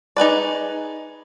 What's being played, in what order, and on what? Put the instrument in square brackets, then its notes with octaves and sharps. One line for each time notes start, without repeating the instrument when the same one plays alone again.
[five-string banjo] D#4 G#4 B4 D5